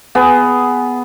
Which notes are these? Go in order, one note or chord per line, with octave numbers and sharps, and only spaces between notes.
B3 G#4